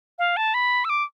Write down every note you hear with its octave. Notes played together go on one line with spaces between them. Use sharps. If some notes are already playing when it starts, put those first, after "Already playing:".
F5
A5
B5
E6
D6